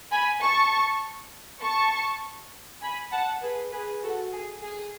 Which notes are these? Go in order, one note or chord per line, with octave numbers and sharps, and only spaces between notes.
G#5 B5
A5 C#6
A5 C#6
G#5 B5
F#5 A5
G#4 B4
G#4 B4
F#4 A4
G#4
G#4